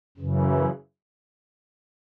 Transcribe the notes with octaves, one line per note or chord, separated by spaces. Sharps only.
F#2 C#3 E3